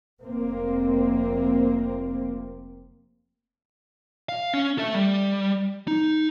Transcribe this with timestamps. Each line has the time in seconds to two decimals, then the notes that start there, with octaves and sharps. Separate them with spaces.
0.22 F1 A#3 C4
4.29 F5
4.54 C#4
4.78 A4 E5
4.94 G3
5.88 D#4